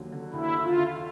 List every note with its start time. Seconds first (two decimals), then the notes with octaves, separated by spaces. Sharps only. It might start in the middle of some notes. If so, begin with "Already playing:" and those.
Already playing: D#2 D3 F#3
0.12 D3
0.34 D#2 E4
0.56 D3
0.63 F4
0.77 D3